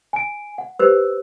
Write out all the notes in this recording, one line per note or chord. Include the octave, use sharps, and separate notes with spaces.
G#5 D7
F#5
G4 B4 C5 E6